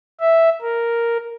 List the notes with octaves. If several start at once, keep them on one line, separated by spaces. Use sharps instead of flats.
E5
A#4